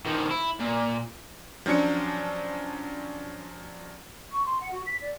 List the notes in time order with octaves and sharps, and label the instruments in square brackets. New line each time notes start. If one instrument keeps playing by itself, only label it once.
[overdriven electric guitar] D#3 F3
E4
A#2
[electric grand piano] F3 F#3 C#4 D4 C#7
[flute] C#6
C6
F#5
F#4
B6
D5